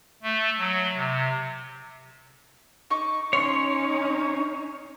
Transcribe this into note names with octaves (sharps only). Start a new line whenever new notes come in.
A3
F#3
C3
D#4 C#6 D6
C#4 D#4 C#5 C6